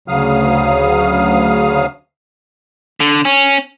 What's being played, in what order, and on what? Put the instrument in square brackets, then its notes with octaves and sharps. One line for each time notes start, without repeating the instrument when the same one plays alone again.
[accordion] D2 C#3 F#3 F5 D#6 F6
[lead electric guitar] D3
C#4